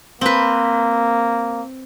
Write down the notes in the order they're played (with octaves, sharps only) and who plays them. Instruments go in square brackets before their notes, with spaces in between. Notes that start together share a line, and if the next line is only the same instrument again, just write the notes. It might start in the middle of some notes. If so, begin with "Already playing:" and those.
[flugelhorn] A#3 [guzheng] C4 B4